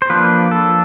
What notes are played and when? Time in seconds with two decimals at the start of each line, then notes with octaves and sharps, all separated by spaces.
0.02 C5
0.10 F3 A#3 D4 B4
0.51 A4